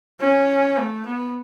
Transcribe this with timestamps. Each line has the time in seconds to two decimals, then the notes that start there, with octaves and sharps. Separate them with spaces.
0.20 C#4
0.78 A3
1.06 B3